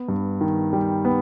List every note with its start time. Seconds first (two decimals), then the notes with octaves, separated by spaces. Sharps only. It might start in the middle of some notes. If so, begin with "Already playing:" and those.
Already playing: B3
0.08 G2
0.41 D#3
0.73 G3
1.05 B3